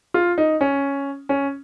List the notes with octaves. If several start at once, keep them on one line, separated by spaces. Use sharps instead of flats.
F4
D#4
C#4
C#4